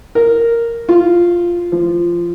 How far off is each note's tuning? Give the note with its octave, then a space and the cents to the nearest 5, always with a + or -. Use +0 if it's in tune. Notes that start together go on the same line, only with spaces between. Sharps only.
A#4 -5
F4 -5
F3 -15